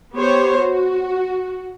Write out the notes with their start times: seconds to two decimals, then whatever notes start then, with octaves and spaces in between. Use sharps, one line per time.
0.16 B3 G4 C5 C#5
0.60 F#4